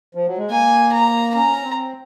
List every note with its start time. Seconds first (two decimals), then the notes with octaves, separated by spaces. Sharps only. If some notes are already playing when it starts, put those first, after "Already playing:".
0.15 F3
0.27 F#3
0.38 G#3
0.50 A#3 G#5
0.93 A#5
1.35 C#4 A#5
1.63 C4